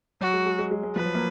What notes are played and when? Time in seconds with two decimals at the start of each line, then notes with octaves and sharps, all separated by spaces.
0.21 F#3 F#4
0.33 G#3
0.46 G#3
0.59 G#3
0.71 G#3
0.83 G#3
0.96 F3 B4
1.05 F#3
1.14 A#3